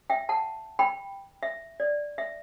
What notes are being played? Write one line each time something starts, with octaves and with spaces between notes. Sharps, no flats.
E5 G5
F#5 A5
G5 B5
E5
D5
E5